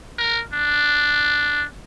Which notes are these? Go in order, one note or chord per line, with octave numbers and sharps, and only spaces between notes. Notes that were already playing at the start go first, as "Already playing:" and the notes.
A#4
D4